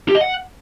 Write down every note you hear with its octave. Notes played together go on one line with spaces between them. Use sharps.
G4
D#5
F#5